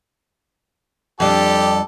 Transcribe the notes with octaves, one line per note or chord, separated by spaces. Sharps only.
F2 G3 D4 G4 A4